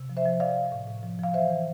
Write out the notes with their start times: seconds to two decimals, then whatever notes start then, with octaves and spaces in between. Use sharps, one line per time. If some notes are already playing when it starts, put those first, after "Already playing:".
Already playing: C3
0.09 F3
0.17 C5 E5
0.26 F3
0.40 F3 D5 F5
0.56 F3
0.72 A2
0.87 A2
1.03 F3
1.19 F3 F5
1.34 E3 C5 E5
1.50 E3